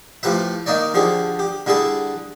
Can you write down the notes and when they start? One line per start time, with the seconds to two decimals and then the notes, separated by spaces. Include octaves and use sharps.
0.23 A2 F3 G4 B4 E5
0.66 D#3 A#3 D#4 C#5 D5
0.94 D3 F3 G4 G#4
1.39 G4
1.66 D3 G3 E4 G#4 A4